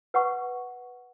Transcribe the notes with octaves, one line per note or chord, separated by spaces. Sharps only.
B4 F#5 C#6